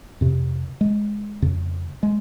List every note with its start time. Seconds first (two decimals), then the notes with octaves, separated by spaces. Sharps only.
0.21 F2 C3
0.81 G#3
1.42 F2 C#3
2.03 G#3